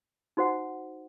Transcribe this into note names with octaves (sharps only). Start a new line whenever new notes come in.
D#4 F#4 C5 F#5